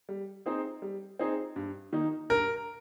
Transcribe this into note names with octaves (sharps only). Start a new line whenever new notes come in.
G3
C4 D#4 G#4 C5
G3
C4 D#4 G#4 C5
G2
D#3 A#3 D#4
G2 A#4